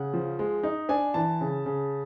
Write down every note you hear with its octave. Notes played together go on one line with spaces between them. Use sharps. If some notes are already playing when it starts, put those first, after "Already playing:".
Already playing: C#3 F#5
F3
G#3
D#4
D4 G#5
E3 A5
C#3
C#3